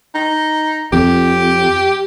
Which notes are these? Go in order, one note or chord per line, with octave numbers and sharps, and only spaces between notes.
D#4
F2 G4